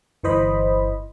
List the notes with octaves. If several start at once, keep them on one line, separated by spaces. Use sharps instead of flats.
G1 E3 C5 D#5 B5